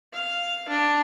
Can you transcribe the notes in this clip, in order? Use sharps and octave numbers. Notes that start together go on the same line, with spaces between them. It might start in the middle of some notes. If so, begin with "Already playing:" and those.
F5
D4